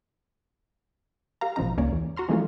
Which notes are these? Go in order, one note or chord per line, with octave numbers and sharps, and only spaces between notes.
G4 A#4 F5 A#5
A1 B2 F3 C#4 D#4 A#5
C#2 A#3 C#4 C#5 D5
E2
F#4 A#5 C6 F6
E3 F3 G#3 A3 C#4 F4